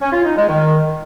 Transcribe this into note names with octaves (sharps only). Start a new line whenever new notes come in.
C#4
F4
D#4
G#3
D#3